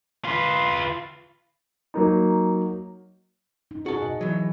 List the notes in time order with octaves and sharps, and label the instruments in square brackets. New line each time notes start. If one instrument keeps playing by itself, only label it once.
[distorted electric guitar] F4 B4
[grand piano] F#3 A#3 D#4
[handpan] D#4
[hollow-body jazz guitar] F#4 A5 [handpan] G#4
[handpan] B2 D#5
[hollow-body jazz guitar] E3 F#3